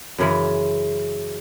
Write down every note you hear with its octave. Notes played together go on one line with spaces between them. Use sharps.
F#2 C#3 E3 G#3